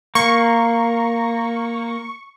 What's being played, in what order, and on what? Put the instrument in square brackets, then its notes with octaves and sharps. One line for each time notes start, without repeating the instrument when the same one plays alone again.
[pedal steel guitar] A#3 [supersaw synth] C#6